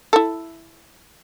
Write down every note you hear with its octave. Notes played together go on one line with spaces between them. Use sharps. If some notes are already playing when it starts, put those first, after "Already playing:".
E4 A4